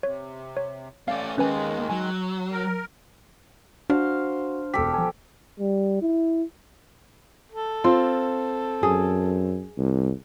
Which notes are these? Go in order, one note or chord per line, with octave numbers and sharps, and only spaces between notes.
C3 C#5
C#5
A3 C#4 D5 F5
D#2 D#3 G#3 A#3 C#4 B4 G#5
F#3 G#5
A#4
D4 F#4 C5 F5
E1 G4 A4 B6
F3 G#5
G3
E4
A4
C4 F4
F#2 G#4
C2